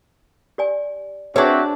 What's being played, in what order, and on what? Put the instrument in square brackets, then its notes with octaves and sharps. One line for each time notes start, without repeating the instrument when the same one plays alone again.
[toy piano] G4 D5 G#5
[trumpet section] C4 F#4 E5 [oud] D4 C#5 [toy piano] G#4 B4 G#5